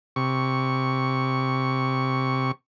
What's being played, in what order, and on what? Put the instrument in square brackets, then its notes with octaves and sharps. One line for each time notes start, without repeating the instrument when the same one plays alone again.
[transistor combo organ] C3 C#6